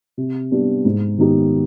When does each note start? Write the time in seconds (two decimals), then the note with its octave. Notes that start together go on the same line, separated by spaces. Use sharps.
0.17 C3
0.51 G3 B3 D4
0.85 G#2
1.18 D#3 B3 D#4 G4